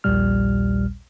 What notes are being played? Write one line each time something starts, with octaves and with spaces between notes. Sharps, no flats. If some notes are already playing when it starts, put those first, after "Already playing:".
A#1 D#2 A#2 G3 F6